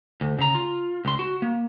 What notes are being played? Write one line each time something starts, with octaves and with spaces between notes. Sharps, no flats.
D2
C#3 A#5
F4
C#2 C6
F#4
A#3